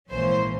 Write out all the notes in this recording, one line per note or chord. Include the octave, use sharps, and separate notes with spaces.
A#1 G#2 E3 A#3 C#4 C5